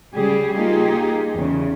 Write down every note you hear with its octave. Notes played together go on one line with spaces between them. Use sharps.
C#3 G3 G4 G#4
A#3 D#4 F4 G4 G#4
E2 C#3